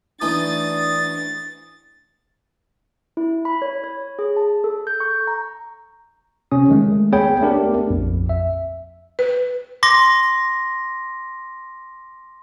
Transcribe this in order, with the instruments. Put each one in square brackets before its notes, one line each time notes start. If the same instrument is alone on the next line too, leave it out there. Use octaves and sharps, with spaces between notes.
[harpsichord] E3 A3 D#4 [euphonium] D4 [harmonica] D#6 [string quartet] A6
[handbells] E4
B5
C#5
C#5
G#4
A5
A4
G6
C#6
A#5
[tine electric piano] C3 C#4 D#6
D#3 G#3 A3
B3 G#4 C#5 G5 B5
A3 B3 D4 G4 A#4
A#1 F2
E5
[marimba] B4
[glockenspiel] C6 D6 A#6